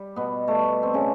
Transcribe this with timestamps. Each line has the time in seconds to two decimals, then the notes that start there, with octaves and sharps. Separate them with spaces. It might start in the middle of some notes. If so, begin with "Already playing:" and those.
Already playing: G3
0.16 B2 B3
0.47 B2 G3 A3
0.83 C4
0.94 C#3 C#4